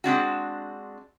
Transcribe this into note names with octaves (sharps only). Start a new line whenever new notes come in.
G#3 C4 D4 F#4